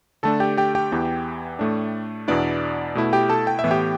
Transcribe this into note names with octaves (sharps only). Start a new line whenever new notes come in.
D3 A3 D4 A4 A5
G4 G5
G4 G5
G4 G5
E2 E3 B3
A2 A3 D4
E2 B2 B3 D4 E4 D5
B2 A3 E4
G4 G5
A4 A5
G5
E5
A2 E3 B3
G4 G5